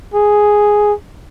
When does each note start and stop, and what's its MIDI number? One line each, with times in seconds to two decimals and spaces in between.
0.14 0.93 68